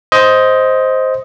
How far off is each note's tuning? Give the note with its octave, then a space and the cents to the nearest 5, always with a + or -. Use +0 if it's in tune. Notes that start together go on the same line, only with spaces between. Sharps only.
C5 +0 D#5 +15